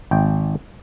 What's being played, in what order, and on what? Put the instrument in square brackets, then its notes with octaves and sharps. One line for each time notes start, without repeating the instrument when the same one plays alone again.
[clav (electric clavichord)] G#1 G5